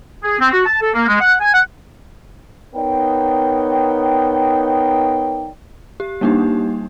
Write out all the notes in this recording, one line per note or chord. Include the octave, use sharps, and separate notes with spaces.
G#4
C4
F#4
A5
A4
A#3
G#3
F#5
G#5
F#5
B3 D#4 A#4 C#5 D5 G5
G4
G3 A#3 D4 D#4 G4